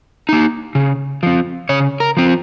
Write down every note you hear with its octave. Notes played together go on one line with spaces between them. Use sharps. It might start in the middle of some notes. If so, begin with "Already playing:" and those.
A#3 D#4
C#3
F3 C4
C#3 C#5
A#4
F3 C4